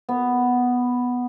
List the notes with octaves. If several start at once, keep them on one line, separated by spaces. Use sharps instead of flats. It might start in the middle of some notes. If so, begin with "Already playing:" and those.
B3